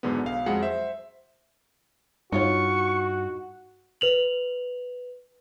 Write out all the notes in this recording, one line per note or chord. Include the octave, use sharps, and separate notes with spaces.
E2 G#2 D3 F#3 B3
B1 F5
F2 F#3 G#3 F#5 C#7
C5 E5
G2 D#4 F4 F#4 C#5 C#6
B4 F7 F#7